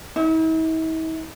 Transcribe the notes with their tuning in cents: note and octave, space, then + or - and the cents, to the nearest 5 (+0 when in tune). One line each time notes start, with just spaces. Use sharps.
E4 -45